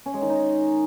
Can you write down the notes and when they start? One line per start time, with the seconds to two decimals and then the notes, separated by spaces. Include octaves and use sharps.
0.06 C#4
0.14 G#3
0.22 D#3
0.30 D#4